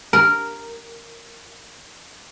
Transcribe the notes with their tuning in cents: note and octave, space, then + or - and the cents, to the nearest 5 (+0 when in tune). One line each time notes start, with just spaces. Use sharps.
A#4 -5